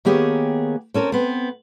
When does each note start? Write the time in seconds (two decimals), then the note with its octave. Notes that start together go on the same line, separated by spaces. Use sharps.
0.05 D#3 A#3 B3 G4 G#4 C#5
0.94 C4 C#4 A4 A#4
1.12 B3 C4